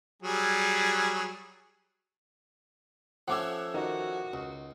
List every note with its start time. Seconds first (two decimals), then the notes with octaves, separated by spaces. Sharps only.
0.22 F#3 G3 G#4
3.28 F3 A3 C#4 F#5 D6 E6
3.74 D#3 F#4
4.33 C#2